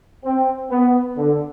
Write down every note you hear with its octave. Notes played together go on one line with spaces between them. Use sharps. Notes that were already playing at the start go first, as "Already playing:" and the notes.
C4
B3
D3